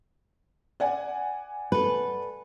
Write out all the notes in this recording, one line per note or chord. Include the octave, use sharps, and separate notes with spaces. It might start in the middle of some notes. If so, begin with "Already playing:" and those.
D5 F#5 G#5
A4 B4